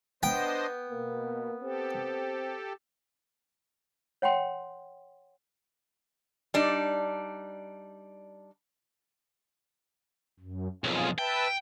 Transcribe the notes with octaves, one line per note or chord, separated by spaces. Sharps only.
B3 D4 C5 D#5 G5
B2 A#3
C4 G4 A4
C#5 F#5 G5 C6
G3 D4 D#4
F#2
B1 F2 F4 G#4
B4 E5 G5 A5